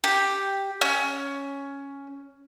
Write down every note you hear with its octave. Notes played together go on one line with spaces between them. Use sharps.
G4
C#4